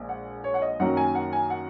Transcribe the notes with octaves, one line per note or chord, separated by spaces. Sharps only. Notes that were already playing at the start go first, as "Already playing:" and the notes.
Already playing: A#1 A#2 G#3
F#5
C#5
F#5
D#5
F#2 D#3 F#3 A#3 F#5
G#5
F#5
G#5
F#5